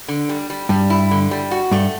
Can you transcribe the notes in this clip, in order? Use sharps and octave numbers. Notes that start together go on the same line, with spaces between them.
D3
G3
G3
G2 G3
E4
D3
G3
F#4
G2 A3